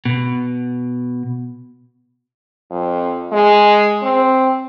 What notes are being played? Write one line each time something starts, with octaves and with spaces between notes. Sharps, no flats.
B2
F2
G#3
C4